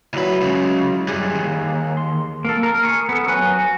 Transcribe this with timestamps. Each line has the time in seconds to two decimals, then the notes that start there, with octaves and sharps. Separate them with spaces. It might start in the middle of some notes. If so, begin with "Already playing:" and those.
0.14 D2 F#3 E4 B4
0.41 C#2 C#3
1.08 F#2 G3 G#4 G#5 F#6
1.35 D#2
1.97 C6
2.45 A#3 A4
2.63 A#4
2.83 G#4 C#6
3.09 B3 A4
3.28 F#3 B4 G#5 C#6 F#6
3.53 F#4